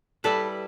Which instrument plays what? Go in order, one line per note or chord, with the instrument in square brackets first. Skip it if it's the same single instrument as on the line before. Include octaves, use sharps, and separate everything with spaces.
[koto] G3 E4 B4 [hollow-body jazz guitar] A4